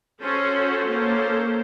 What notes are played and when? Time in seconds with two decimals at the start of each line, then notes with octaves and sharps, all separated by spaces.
0.21 C#4 F#4 A4 C5
0.86 A#3 C#4 A4 C5